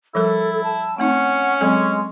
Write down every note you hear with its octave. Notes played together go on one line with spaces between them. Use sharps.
F3 G3 E4 A4 A#4
A5
A3 C4 C#4 D#4 F#5
F#3 G#3 C4 A4